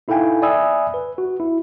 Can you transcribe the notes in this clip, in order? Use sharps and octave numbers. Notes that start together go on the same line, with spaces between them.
D#4 E4 A4 F5 G5 G#5
D5 E5 G#5 B5 D#6 E6
B4
F#4
E4